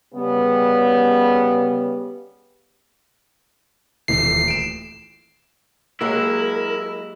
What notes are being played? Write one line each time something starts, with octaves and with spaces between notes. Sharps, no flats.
C#3 G3 B3
D#1 E3 A3 C7
D7 E7
F#3 G#3 A#3 E4 G4 A#4